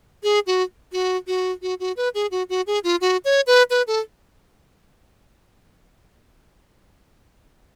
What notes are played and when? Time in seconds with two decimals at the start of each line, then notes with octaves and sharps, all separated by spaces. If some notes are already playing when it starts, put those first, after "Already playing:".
0.23 G#4
0.47 F#4
0.93 F#4
1.27 F#4
1.62 F#4
1.80 F#4
1.97 B4
2.15 G#4
2.31 F#4
2.49 F#4
2.67 G#4
2.84 F4
3.01 F#4
3.25 C#5
3.47 B4
3.70 B4
3.87 A4